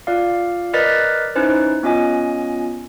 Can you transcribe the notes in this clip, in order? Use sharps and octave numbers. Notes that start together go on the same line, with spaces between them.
F4 D5 F5
A#4 B4 D5 D#5 A6 B6
C#4 D#4 E4 B4 C5
B3 C#4 F4 D#5 G#5